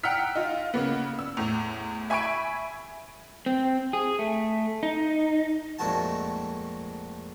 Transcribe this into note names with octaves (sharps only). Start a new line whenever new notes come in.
F#5 G5 A#5 E6 F6 B6
D#4 F4
C#3 A#3 B3
E6
E2 A2 F7
E5 G#5 B5 C#6 G#6 D7
C4
G#4
A3
D#4
F2 A#2 G#3 A3 F#4 A5